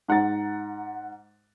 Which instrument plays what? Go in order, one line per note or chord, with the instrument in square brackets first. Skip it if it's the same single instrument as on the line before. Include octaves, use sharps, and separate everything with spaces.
[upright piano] G#2 F#5 A#5 A6